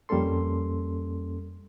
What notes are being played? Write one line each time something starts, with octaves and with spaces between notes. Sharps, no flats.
F2 G3 A#3 C#4 A4 C6